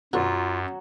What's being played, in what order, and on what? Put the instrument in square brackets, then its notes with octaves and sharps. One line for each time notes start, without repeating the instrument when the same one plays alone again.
[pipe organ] F#2 [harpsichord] B2 D3 [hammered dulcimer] F#3 [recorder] F4